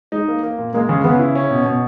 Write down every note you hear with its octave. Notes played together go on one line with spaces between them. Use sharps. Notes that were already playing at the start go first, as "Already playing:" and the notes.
G#3 D#4
A#3
A#3
A#2
G#3 A#3
C#3
C#3 B3
E4
C#4
B2
B2